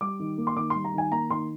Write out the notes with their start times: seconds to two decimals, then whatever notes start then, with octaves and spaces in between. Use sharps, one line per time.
0.01 G3 D6
0.19 D#3
0.38 A#3
0.47 C6
0.56 D#3 D6
0.70 G3 C6
0.84 A#5
0.94 D#3 G#5
1.11 A#3 A#5
1.30 D#3 C6